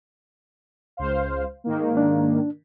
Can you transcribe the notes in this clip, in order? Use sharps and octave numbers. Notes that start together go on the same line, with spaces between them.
C#2 C5 F5
G#2 D#3 A#3
D4